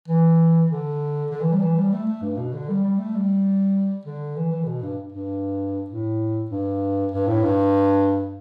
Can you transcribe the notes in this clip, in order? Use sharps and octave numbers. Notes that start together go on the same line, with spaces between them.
E3
D3
D3
E3
G3
E3
G3
A3
A3
G2
B2
D3
G3
G3
A3
G3
D3
E3
E3
D3
B2
G2
G2
A2
G2
G2
A2
G2